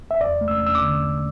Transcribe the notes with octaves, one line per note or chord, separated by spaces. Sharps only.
E5
E2 D5
A3
E6
E2
E6
D6
D3
E2